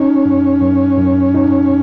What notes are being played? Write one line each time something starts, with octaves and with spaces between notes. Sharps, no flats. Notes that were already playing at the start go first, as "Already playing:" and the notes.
Already playing: C#4 D#4
F#2
F#2
F#2
D#4